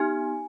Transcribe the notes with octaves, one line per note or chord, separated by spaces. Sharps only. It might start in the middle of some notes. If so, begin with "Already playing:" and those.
Already playing: B3 D#4 G4 G#5